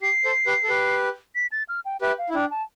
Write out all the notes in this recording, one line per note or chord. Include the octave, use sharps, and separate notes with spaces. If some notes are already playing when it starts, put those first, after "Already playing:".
G4 C7
A4 C5
G4 B4
A4
G4 B4
B6
A6
F6
G5
G4 B4 E5
F5
E4
D4 G5
A5